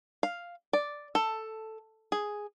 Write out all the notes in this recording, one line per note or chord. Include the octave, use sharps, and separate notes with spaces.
F5
D5
A4
G#4